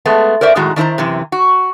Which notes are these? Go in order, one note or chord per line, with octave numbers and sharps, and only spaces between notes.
G#3 A3 B3
A#4 C5 D5 E5
F#2 A2 D#3 G#3 F#4 A#5
D#3 D4 E4 C5 A#5
F#2 C3 E3
F#4